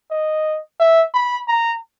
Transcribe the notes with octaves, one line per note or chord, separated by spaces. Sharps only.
D#5
E5
B5
A#5